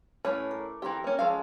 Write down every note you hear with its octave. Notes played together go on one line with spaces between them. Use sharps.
A2 C#4 B4 C#5 D5 D6
A#4
E3 C4 G4 A#5
A#3 C#4
F3 G#3 C#4 A4 F5